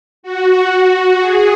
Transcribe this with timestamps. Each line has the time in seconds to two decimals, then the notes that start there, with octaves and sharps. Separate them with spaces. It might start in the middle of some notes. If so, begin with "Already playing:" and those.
0.23 F#4
1.20 G#4